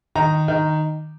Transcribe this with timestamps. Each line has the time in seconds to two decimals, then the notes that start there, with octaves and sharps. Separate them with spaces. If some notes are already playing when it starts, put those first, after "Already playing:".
0.15 D#3 A#5
0.48 D#3